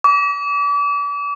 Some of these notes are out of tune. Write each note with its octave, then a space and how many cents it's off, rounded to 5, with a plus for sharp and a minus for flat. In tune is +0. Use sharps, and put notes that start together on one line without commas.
D6 -40